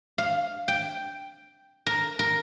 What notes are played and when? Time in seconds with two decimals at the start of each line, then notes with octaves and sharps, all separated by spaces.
0.18 F5
0.68 G5
1.86 A#4
2.19 A#4